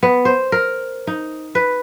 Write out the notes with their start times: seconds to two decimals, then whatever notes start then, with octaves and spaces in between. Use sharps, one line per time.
0.03 B3
0.25 C5
0.52 A#4
1.07 D#4
1.55 B4